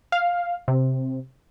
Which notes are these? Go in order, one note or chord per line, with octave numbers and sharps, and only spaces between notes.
F5
C3